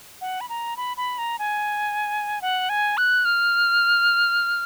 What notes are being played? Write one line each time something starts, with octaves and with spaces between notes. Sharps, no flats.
F#5
B5
A#5
B5
B5
A#5
G#5
F#5
G#5
F#6
F6